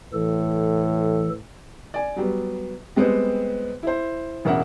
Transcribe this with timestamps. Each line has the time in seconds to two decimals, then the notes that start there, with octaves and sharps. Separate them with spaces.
0.13 A2 E3 A4
1.94 D5 G#5
2.16 F#3 G3 B3
2.96 G3 G#3 B3 C4 C5
3.83 E4 C5
4.45 E1 A1 A#4 E5 F#5